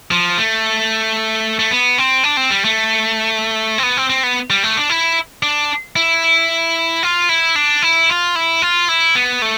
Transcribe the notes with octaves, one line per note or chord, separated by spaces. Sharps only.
F3
A3
A3
B3
C4
D4
C4
G3
A3
C4
B3
C4
C4
B3
G3
A3
D4
E4
D4
E4
F4
E4
D4
E4
F4
E4
F4
E4
B3
A3